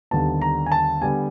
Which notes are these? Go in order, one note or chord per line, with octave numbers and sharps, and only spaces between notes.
D#2 D3 G3 B3 A5
A#5
G#5
A5
D3 G3 B3 G#5